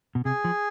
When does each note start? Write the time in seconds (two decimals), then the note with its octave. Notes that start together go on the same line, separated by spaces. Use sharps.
0.15 B2
0.25 C3 G#4
0.44 F3